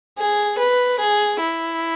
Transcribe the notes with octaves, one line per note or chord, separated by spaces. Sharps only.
G#4
B4
G#4
E4